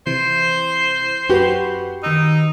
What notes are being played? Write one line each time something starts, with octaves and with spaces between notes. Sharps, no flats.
C3 E3 E4 C5
F#2 F#4 G4 B4 F#5
D#3 D#4 E6